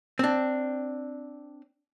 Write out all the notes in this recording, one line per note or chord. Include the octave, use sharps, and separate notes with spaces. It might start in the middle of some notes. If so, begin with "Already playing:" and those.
C4 D4